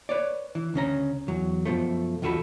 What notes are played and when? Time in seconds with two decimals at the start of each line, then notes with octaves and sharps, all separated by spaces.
0.09 B4 C#5 D5
0.55 E3
0.74 D2 C#3 C#4 A#5
1.28 E2 F#3
1.66 F#2 B2 F3 A3
2.22 B1 E2 F4 F#4 A4 B5